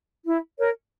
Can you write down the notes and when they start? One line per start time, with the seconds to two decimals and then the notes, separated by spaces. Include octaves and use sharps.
0.25 E4
0.57 A#4 C#5